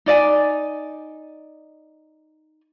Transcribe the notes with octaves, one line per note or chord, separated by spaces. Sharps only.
D#4 D5 D#5 G#5